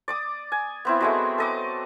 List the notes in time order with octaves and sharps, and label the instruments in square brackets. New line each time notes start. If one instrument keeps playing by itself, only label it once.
[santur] D5 D6 D#6
G#5
B3 C4 E4
F#3 G#3 A3
A4 D#5 D6